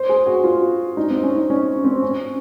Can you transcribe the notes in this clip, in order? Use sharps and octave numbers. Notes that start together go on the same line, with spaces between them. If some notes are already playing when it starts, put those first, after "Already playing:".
Already playing: C5
G#4
F#4
F4
D#4
C4
C#4
D#4
C#4
C4
C#4